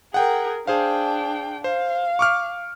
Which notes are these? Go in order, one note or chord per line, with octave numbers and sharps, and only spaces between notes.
G#4 A#4 F#5 G5
D4 G#4 C5 F5 G5
C5 F5
C#6 D6 F6